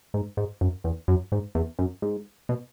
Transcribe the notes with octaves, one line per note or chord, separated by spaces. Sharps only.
G#2
G#2
F#2
E2
F#2
G#2
E2
F#2
G#2
B2